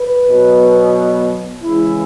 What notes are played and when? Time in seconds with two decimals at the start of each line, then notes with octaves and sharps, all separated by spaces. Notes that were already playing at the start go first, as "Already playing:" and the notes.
Already playing: B4
0.27 B2 F#3 B3
1.62 C#3 E3 G#3 E4